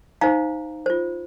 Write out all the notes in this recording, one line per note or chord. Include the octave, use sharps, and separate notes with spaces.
D#4 C5 F5 A#5
F4 C5